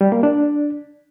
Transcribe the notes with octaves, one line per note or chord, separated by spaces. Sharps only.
G3
A#3
D4